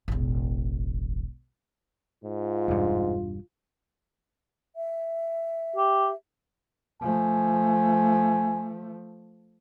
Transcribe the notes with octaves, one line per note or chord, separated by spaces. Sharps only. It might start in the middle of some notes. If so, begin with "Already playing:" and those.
E1 A1
G#2 F4
E1 G2
E5
G4
F3 A3 G#5